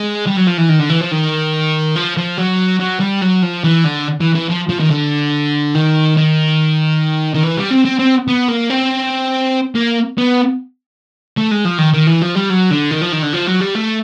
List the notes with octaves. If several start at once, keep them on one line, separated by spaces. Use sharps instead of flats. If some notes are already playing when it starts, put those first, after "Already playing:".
Already playing: G#3
G3
F#3
F3
E3
D#3
D3
E3
F3
D#3
F3
F3
F#3
F#3
G3
F#3
F3
E3
D3
E3
E3
F3
F3
D#3
D3
D#3
D#3
D#3
E3
G3
C4
C4
C4
B3
A#3
C4
A#3
B3
A3
G#3
F3
D#3
D#3
E3
F3
G3
F#3
D3
D#3
F3
D#3
D3
F3
F#3
G3
A3